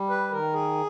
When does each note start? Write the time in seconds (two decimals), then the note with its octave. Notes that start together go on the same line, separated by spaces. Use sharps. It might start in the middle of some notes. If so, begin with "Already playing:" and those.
Already playing: G3
0.10 B4
0.32 D#3 A#4
0.54 G#4